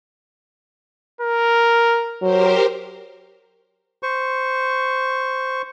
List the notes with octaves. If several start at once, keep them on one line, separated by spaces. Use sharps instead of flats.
A#4
F#3 G4 A#4 C5
C5 C#6